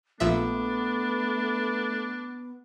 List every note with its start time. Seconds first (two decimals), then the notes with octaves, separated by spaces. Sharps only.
0.20 A#1 F3 A3 B3 D4 E5